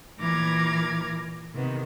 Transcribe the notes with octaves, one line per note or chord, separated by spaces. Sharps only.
A#2 E3 A#5 D6 F6 G#6
C3 D#3 B3